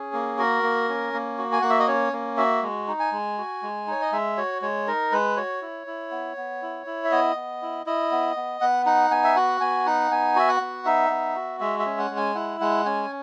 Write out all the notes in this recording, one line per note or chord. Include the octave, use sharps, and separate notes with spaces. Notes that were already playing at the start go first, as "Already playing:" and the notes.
Already playing: C#4 G#4
A#3
F#4 A#4
A#3
C#4
A#3
F#4
G#5
A#3 F#5
E5
D#5
C#4 C#5
A#3
F#4 E5
G#3
D#4
G#5
G#3
F#4
G#3
D#4 C#5
D#5
G#3 E5
F#4 C#5
G#3 C#5
D#4 A#4
G#3 B4
F#4 C#5
E4
E4
B3
B3
E4
E4
E5
B3 D#5
B3
E4
E4 D#5
B3
B3
B3 F#5
D#4 F#5
B3 G#5
E5
F#4 F#5
B3 G#5
D#4 F#5
B3 G#5
F#4 E5
F#5
B3
D#4 E5
B3
F#4
G#3 E5
E5
C#4
F#5
G#3
G#5
E4 F#5
G#3 F#5
C#4 G#5